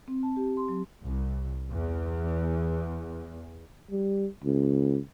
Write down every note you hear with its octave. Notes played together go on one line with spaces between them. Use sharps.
C4
A5
G4
C6
F#3
C2
E2
G3
C#2